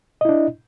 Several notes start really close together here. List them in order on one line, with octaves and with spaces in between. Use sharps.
D#5 E4 D4